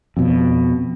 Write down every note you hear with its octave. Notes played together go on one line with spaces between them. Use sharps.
F2 B2